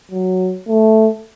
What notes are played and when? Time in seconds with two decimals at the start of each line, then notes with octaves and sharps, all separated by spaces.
0.11 F#3
0.68 A3